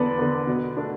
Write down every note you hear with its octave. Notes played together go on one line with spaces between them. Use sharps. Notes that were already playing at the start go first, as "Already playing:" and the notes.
Already playing: E2 D3 B3 A4 B4 D5
D3 B3
B2
A3 D4